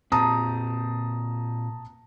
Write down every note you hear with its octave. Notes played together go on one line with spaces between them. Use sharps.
A#2 C4 A5 A#5 D#6